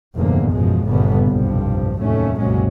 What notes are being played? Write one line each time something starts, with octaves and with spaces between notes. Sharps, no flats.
F1 E2 G2 A#2 D3 A#3
A1 F#2 B2 F3 G#3
G1 A#2 C#3 G3 B3
F1 B1 G2 A#2 F3
F1 D#2 A2 F#3 A3 C#4
F#1 C2 A#2 F#3 G#3 C#4